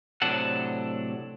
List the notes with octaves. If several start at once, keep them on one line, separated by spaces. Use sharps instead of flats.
A2 C3 F#3 D4 A4 F#5